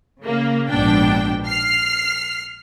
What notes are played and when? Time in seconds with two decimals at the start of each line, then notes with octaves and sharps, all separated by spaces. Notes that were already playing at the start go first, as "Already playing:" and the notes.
0.22 C#3 A#3
0.69 A#1 G#2 B2 D4 G5
1.47 F6 C7